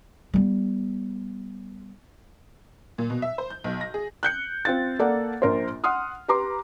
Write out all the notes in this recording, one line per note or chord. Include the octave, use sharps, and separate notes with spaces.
G3 B3
A#2
B2
E5
C5
G6
B1
A#6
G#4
F#6 G6 C#7
C4 F4 A6
A#3 A4 D5 F#5
A#1 A#4 C5
F#5 C6 D#6 F6
G4 B4 A#5 C6 D6